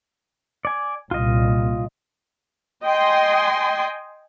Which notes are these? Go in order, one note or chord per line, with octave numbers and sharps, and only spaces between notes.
D5 G#5
C2 A#2 F4 D#5
D#5 G5 G#5 C6